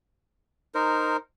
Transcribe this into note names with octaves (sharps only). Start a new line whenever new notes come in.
D#4 A#4 C5